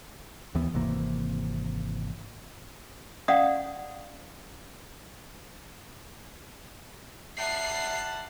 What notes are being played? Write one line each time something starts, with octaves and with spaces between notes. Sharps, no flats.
D#2 E3 B3
G#1 C3 E3 A#3
C#4 D5 F5 F#5 D#6
G3 E5 F#5 A5 C7